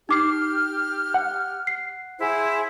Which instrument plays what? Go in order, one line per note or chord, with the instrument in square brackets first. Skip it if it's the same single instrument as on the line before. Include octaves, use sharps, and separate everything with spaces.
[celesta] D#4 D6 C7 [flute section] G4 F6
[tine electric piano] F#5
[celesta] C7
[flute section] E4 G#4 C5